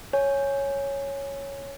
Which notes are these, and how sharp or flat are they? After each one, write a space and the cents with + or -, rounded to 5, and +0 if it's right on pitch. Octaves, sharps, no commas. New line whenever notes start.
C#5 +0 G#5 +0